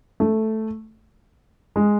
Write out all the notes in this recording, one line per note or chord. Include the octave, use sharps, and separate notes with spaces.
A3
G#3